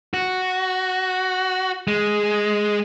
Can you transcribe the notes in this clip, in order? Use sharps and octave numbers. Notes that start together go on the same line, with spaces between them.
F#4
G#3